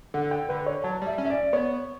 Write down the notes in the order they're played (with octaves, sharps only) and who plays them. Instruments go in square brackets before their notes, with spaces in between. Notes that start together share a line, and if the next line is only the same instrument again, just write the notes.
[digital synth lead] D3 [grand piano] F#5
[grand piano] G5
[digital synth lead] D3 [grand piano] B4
[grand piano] C#5
[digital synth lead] F#3 [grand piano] A5
[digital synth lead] G3
[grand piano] E5
[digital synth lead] C#4
[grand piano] E5
D5
[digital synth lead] B3 [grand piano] C#5